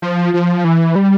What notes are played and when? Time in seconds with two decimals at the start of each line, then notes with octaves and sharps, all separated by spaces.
0.02 F3
0.34 F3
0.64 E3
0.95 G3